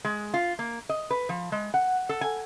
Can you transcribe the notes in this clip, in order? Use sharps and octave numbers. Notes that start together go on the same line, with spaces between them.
G#3
F4
A#3
D#5
B4
F3
G#3
F#5
A4
G#5